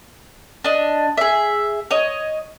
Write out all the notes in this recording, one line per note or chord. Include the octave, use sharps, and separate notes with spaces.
D4 D#5
G#4 E5
C#5 D#5